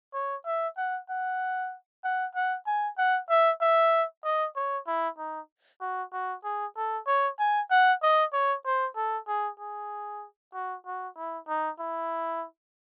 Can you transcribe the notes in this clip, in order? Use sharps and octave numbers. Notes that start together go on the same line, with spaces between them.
C#5
E5
F#5
F#5
F#5
F#5
G#5
F#5
E5
E5
D#5
C#5
E4
D#4
F#4
F#4
G#4
A4
C#5
G#5
F#5
D#5
C#5
C5
A4
G#4
G#4
F#4
F#4
E4
D#4
E4